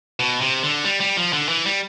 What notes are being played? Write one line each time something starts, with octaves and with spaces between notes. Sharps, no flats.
B2
C3
D3
G3
G3
F3
D3
E3
G3